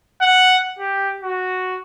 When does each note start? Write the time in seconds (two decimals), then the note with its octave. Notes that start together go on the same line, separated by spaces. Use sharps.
0.21 F#5
0.79 G4
1.22 F#4